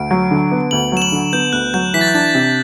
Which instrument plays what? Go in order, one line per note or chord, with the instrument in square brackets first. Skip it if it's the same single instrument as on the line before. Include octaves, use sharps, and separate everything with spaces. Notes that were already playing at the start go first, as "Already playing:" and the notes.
Already playing: [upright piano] D2 [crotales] D7
[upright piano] F#3
D3
B3
[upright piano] D2 [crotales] F#7
[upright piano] F#3 [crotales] E7
[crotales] F#7
[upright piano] D3
[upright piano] B3 [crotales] G6
[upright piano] D2 [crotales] F#6
[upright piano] F#3 [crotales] G6
[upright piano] E3 [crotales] B6
[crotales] A6
G6
[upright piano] D4 [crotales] A6
[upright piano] C3